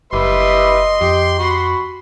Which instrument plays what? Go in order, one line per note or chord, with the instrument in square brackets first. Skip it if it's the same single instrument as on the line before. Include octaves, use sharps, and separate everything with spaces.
[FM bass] F#1 [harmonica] G3 B4 E5 [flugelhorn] D#5 [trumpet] C6
[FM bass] F2 [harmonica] G4
[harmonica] F#4 B5